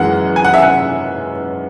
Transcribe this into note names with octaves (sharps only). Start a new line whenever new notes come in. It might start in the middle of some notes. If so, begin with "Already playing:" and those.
Already playing: F#2 E3 G#3 F#5
G#5
F#5
E5
F#5